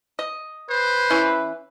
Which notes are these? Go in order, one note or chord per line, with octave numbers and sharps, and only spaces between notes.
D#5
B4 C5
E3 C#4 E4